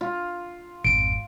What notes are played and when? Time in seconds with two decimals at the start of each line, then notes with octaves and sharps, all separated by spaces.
0.01 F4
0.85 G#1 F2 D7